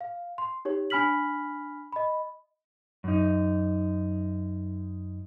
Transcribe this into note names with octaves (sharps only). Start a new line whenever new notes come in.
F5
C6
D#4 G4 C#5
D4 G#5 B5 F6 B6 F#7
D#5 B5
F#2 D#4